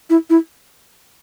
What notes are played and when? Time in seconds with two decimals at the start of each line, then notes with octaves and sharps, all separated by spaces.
0.10 E4
0.30 E4